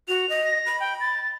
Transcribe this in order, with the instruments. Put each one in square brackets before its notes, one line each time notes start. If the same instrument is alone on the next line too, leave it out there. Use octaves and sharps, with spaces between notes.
[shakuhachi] F#4 [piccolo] F7
[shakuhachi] D#5
[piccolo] A#6
[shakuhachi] B5
[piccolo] G5
A6